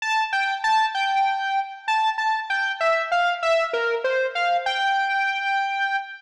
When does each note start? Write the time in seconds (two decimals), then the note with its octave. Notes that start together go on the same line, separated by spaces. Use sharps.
0.02 A5
0.33 G5
0.64 A5
0.95 G5
1.88 A5
2.18 A5
2.50 G5
2.81 E5
3.12 F5
3.43 E5
3.73 A#4
4.04 C5
4.35 F5
4.66 G5